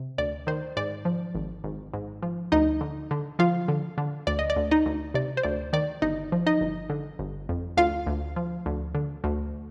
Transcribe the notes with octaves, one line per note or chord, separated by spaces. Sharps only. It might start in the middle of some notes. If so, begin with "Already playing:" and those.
Already playing: C3
D2 D5
D#3 C5
G#2 D5
F3
G#1
G#1
G#2
F3
D2 D#4 D#5
D3
D3
F3 F4 F5
D3
D3
D2 D5
D#5
D5
D2
D#4 D#5
D2
C3 D5
C5
D2 D5
D#3 D5
G1 D#4 D#5
F3
D#4 D#5
G1
D3
G1
F2
D2 F4 F5
D2
F3
D2
D3
D2